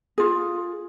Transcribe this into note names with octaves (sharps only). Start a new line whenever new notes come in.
F4 G#4